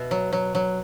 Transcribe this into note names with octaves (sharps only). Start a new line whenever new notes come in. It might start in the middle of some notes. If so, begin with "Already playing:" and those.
Already playing: B2 E5
F#3
F#3
F#3